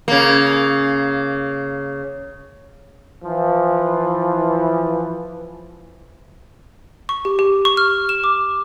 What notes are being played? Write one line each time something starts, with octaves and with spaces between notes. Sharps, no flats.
C#3 A#3
E3 F3
C#6
G4
G4
C#6
F6
E7
D6